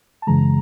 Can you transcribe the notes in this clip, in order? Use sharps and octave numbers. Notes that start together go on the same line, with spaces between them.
A5
F#2 C#3 E3 G#3 A#5